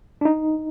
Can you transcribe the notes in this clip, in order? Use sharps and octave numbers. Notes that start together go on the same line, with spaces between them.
D4
D#4